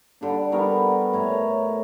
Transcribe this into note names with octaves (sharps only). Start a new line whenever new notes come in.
D3 G3 D4
G3 B3 A#4 C#6
A2 A#4 C#5